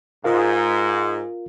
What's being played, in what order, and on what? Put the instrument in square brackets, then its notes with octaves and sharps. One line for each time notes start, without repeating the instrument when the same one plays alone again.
[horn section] G#2 [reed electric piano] F4 A#4 F5